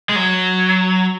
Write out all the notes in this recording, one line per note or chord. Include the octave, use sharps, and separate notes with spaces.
G#3
F#3